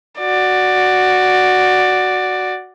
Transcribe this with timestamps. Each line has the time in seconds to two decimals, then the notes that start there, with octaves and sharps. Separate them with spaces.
0.20 F#4 D5